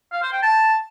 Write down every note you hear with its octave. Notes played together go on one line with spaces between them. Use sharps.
F5
C5
G5
A5